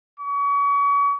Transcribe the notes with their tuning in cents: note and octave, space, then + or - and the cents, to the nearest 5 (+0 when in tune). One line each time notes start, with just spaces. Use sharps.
C#6 +35